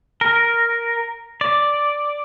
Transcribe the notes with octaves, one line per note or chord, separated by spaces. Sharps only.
A#4
D5